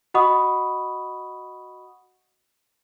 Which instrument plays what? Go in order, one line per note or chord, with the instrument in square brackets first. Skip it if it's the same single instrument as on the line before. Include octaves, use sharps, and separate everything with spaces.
[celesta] F#4 D#5 F#5 B5 C#6 D#6